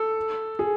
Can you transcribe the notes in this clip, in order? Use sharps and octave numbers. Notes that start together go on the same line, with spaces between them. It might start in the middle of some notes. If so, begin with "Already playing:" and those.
Already playing: A4
G#4